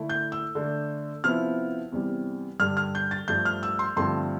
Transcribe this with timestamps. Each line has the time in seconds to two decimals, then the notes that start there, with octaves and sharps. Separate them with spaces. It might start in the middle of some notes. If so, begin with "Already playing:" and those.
Already playing: D3 A3 E4
0.09 G6
0.32 E6
0.55 D3 A3 D4
1.24 C3 F3 B3 E4 F6
1.92 E2 C3 G3
2.60 G2 D3 G3 F6
2.77 F6
2.95 G6
3.11 A6
3.28 G2 F3 A3 G6
3.45 F6
3.63 E6
3.79 C6
3.97 G2 D3 F3 A3 C4 C6